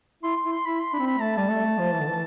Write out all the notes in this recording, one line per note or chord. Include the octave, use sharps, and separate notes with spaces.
E4 C6
C6
E4
C6
E4 B5
C6
D4 B5
C4
B5
A3 A5
G3 A5
A3
A3
F3
E3
D3
E3